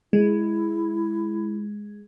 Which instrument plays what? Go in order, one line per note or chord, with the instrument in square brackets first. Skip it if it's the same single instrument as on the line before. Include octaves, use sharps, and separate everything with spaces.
[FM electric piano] G#3 [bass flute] E4